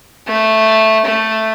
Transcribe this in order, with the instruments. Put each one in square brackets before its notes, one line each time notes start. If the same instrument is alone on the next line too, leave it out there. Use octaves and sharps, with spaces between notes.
[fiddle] A3
A3